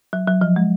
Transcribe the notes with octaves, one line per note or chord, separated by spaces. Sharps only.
F#3
F#3
F3
G#3